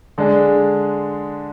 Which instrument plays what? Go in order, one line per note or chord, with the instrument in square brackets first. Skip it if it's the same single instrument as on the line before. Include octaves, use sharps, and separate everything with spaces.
[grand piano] D3 G#3 D4 G#4